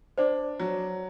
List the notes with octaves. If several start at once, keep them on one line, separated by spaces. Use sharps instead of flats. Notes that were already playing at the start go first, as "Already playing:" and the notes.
D4 C5 D5
F#3